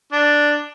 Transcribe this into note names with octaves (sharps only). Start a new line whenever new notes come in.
D4